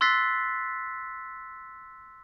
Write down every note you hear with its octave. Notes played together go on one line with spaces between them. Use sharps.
C6 E6 F#6 A6 B6 C7